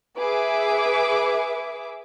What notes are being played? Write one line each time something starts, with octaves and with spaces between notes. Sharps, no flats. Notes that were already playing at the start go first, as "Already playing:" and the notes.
G#4 B4 E5 D6